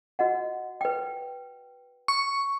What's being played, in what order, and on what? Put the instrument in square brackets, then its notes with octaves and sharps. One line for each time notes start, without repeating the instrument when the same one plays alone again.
[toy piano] F#4 D#5 F#5
B4 G5
[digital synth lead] C#6